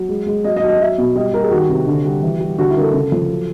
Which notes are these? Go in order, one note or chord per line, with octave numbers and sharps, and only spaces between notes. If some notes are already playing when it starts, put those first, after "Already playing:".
Already playing: F#3
G#3
G#3
F#3 D#5
D#5
F#3
D#5
F#3 E5
B2
G3 D#5
G3 A#4
G#4
D#3 F#4
C3
D3
G3
E3
G3
D3 F#4
E4
D3 A#4
A4
C#3
F3
F#3